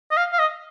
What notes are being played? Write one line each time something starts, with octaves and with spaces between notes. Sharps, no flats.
D#5
F5
F5
D#5